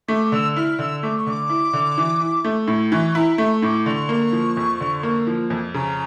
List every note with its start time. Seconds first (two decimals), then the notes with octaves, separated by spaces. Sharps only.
0.08 A3 D6
0.32 D3 E6
0.56 E4 F6
0.79 D3 E6
1.03 A3 D6
1.17 C#6
1.27 D3 D6
1.49 E4
1.73 D3
1.98 E3
2.21 E4
2.44 A3
2.68 A2
2.92 E3 C#6
3.11 C#6
3.15 E4 A#5
3.38 A3 C#6
3.62 A2 D6
3.86 D3 C#6
4.09 A#3
4.32 F3
4.57 F2
4.80 D3
5.03 A#3
5.27 F3
5.50 F2
5.74 C#3 A#5